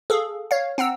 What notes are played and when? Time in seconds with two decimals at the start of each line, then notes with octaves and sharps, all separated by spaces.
0.10 G#4 A4 F5
0.51 C#5 F5
0.78 C4 F#5 A#5 E6